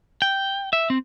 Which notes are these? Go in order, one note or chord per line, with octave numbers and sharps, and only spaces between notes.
G5
E5
C4